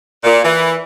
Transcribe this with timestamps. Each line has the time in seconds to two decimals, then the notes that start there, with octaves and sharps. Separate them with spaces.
0.24 A#2
0.44 E3